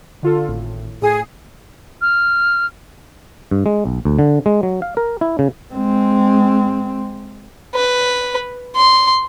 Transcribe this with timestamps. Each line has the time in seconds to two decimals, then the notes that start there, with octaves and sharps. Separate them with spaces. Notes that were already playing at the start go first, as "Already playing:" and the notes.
0.23 D3 F4 A4
0.48 G#1 A2
1.02 A2 G#4 D#6 C7
2.02 F6
3.51 G2
3.66 G#3
3.85 B1
4.05 D2
4.19 D3
4.46 G#3
4.63 F#3
4.82 F5
4.97 A#4
5.21 E4
5.39 C#3
5.74 G#3 C4
7.75 B4
8.76 C6